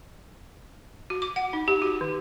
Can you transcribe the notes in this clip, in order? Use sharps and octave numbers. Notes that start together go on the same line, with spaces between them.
F#4
D6
F#5
D#4
G4
F#4
D#3